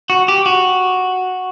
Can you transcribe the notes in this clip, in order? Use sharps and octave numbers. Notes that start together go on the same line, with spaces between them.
F#4
G4
F#4